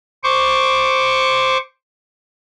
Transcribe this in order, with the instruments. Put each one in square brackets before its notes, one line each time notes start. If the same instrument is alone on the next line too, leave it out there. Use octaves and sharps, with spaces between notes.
[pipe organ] C5 C#6 D6